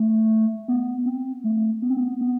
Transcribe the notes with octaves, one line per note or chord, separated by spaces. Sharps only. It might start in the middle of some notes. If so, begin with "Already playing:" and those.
Already playing: A3
B3
C4
A3
B3
C4
B3
B3